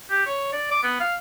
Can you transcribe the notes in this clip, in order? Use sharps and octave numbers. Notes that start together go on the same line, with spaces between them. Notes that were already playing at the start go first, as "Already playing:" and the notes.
G4
C#5
D5
D6
B3
F5